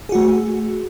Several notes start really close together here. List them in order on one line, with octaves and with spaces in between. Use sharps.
G#4 F#4 A3